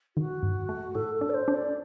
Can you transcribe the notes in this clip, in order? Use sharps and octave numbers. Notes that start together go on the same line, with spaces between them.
D#3 F#4
G2
A3
A2 A4
A4
D4
D5
C5
D4
D5